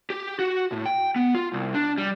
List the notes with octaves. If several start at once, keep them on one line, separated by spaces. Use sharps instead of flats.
G4
F#4
A2
G5
B3
F4
C2
D4
G3